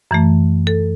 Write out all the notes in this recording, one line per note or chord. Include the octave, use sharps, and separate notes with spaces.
F#2 E3 A3
A4